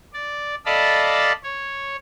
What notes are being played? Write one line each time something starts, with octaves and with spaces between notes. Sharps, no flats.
D5
A4 D5 D#5 F5 A5 B5
C#5